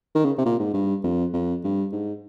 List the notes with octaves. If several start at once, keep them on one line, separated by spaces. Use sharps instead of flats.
D#3
C#3
C3
A#2
G#2
G2
F2
F2
G2
G#2